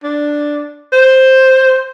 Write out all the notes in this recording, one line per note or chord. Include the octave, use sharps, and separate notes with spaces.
D4
C5